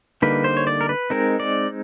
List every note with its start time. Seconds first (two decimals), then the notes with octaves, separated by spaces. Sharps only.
0.22 D3 G3 A#3 D#4 B4
0.44 C5
0.57 C#5
0.67 D5
0.81 A#4
0.89 B4
1.10 G#3 C4 D#4 A#4
1.40 D5